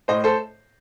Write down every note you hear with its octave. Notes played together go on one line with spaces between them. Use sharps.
A2 C5 D#5
A4 C5